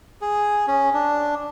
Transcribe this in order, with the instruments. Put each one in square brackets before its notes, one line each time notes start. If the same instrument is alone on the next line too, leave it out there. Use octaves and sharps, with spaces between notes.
[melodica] G#4
C#4
D4